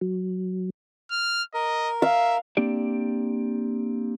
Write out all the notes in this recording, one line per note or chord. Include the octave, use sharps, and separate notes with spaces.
F#3
F6
A#4 D#5
E5 F5
A#3 C4 D4 G4 D5